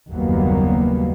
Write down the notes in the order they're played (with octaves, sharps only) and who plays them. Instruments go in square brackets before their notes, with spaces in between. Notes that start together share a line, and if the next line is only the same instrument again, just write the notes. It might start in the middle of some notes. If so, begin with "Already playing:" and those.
[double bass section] F#1 D#2 F#3 G3 A#3 B3